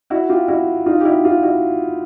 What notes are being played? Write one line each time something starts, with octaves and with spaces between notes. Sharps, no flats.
E4 F#4
F4 G4
E4 F#4
D#4 F4
G4
E4 F#4
F4 G4
E4 F#4